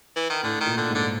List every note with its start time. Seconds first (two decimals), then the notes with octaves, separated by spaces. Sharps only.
0.16 E3
0.30 D#3
0.43 A2 D3
0.61 D#3
0.66 A#2
0.78 D3
0.89 G#2
0.95 D3